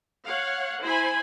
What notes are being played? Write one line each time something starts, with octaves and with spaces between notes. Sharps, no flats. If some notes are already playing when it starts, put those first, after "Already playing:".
C#5 F5 F#5
E4 C5 G#5 B5